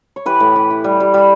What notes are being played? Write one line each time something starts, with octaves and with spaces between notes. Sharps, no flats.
C#5
E3 G4 B4
A2
E3
E3
G3
G3
G3